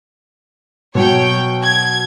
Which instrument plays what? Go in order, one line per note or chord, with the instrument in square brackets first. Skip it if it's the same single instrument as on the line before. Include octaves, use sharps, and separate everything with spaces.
[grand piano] B2 F#3 [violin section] C#5 G5
[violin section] G#6